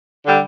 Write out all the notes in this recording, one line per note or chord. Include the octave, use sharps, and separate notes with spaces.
D3 G3